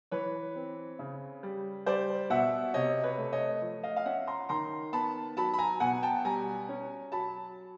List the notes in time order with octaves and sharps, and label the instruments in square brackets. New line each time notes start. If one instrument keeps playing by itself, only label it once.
[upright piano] E3 B4 C#5
C4
C#3
G3
G3 C5 D5
B2 E5 F#5
C3 C#5 D#5
B4 C#5
A3
C#5 D#5
F3
D#5 F5
F5
C#4 E5 F#5
A#5 C6
D#3 A#5 C6
B3 A5 B5
F#3 A5 B5
B5
G#5 A#5
B2 F#5 G#5
G5 A5
G3 G#5 A#5
C#4
F#3 A5 B5